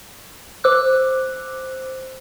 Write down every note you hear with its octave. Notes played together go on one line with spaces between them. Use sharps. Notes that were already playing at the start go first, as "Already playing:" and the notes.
C5 D6 E6 F#6